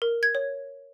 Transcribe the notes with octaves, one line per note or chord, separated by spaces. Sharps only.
A#4
G#6
C#5